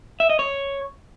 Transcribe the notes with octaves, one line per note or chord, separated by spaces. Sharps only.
E5
D#5
C#5